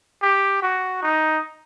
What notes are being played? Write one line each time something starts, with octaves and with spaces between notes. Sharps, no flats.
G4
F#4
D#4